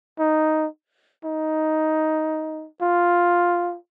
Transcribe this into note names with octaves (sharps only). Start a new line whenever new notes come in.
D#4
D#4
F4